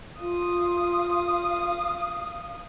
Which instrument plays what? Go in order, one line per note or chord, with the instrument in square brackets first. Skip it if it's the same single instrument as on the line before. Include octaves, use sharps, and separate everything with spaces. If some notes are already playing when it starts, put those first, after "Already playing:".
[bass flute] F4 [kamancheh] F5 D#6